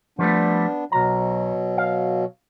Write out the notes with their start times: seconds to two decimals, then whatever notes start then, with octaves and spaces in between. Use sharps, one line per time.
0.19 F3 G3 A3 B3 D4
0.92 B1 B2 F#3 A#5
1.78 F5